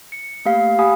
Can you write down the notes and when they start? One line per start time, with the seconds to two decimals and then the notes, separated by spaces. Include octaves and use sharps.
0.12 C#7
0.45 A3 A#3 G4 F5 C7
0.79 G4 F5 F#5 G#5 B5 D#6